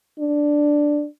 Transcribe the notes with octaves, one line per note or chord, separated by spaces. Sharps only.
D4